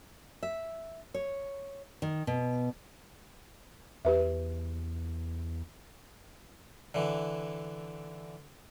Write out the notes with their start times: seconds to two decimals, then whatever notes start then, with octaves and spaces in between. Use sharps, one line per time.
0.43 E5
1.14 C#5
2.02 D#3
2.27 B2
4.05 E2 G4 B4 E5
6.94 D3 E3